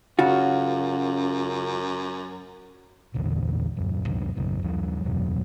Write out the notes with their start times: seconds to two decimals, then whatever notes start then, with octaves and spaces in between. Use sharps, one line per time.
0.19 F#2 C#3 F4 F#4
3.14 E1 A#1 E2 D3
3.77 D#1 F#2
4.06 C#2 F#2 C3 D#3
4.36 B1 F#2 C#3 F#3
4.63 D#2 F3 G3
5.05 F#1 E2 B2 F#3